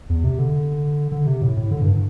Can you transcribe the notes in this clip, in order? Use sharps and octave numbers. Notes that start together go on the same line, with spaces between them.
E2
C3
D3
D3
C3
A2
A2
D3
G2